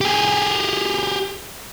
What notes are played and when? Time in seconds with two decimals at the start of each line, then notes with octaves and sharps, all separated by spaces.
0.01 G4 G#4